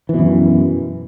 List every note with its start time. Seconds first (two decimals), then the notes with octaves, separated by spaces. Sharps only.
0.09 E3
0.14 B2
0.19 F#2